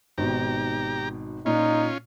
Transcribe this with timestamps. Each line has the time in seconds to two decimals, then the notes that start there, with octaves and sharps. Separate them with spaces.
0.18 G#1 B2 D#3 G4 A#5
1.46 A#2 C#4 D#4 F4